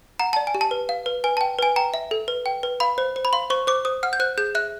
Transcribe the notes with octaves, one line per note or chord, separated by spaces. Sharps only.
F#5 A#5
D5 A5
G#5
G4
A5
B4
F5
B4
B4 G#5
G5 A5
B4 G#5
G5 A#5
E5
A4
B4
G5
B4
F5 B5
C5
C5
B5
F5 C6
C5 C#6
C5 D6
C5 D#6
F#5 F6
G6
C5 F#6
G#4 G6
E5 F#6